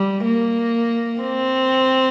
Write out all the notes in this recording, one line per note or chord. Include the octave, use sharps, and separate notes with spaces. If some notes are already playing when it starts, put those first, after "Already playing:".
Already playing: G3
A#3
C4